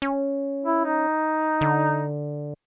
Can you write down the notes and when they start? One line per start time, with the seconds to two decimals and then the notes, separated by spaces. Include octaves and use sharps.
0.02 C#4
0.64 E4
0.85 D#4
1.61 D3